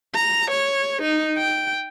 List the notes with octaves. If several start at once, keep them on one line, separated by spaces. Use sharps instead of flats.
A#5
C#5
D#4
G5